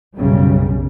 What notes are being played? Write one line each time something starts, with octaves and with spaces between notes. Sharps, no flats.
B1 F#2 C#3 G3